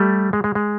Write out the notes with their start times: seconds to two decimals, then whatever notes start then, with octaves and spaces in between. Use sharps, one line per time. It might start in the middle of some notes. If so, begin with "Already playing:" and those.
Already playing: G3 A3
0.33 G#3
0.44 G#3
0.55 G#3